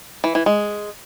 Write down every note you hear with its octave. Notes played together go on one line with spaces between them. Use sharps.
E3
E3
G#3